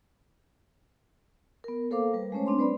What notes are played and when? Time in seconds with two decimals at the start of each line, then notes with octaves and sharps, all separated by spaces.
1.64 B3 A#4
1.90 A#3 A4 A#4 C5 F5 D6
2.14 G3 B4
2.32 G#3 A3 C#4 C5 C#5
2.47 G3 C4 D4 C6
2.59 B4 C5 D5 B5